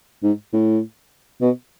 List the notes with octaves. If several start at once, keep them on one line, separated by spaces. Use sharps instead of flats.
G#2
A2
B2